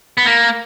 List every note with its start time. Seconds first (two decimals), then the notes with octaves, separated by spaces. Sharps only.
0.17 B3
0.26 A#3